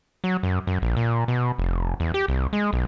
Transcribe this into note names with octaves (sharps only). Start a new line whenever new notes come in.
F#3
F#2
F#2
A#1
A#2
B2
F1
E2
G4
C2
G#3
B1